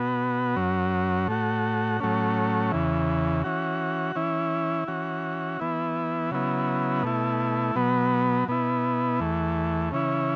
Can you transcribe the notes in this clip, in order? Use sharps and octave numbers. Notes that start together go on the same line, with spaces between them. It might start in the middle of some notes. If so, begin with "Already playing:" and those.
Already playing: B2 B3 F#4
F#2 F#3 C#4
A2 A3 F#4
A2 F#3 A3 C#4
E2 C#3 E3
E3 C#4 F#4
E3 C#4 E4
E3 C#4 F#4
E3 B3 E4
C#3 F#3 B3 E4
B2 A3 E4
B2 F#3 B3
B2 B3 E4
E2 E3 A3
C#3 E3 C#4 E4